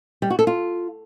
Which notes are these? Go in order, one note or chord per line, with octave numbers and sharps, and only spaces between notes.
G3
F#4
A4
F4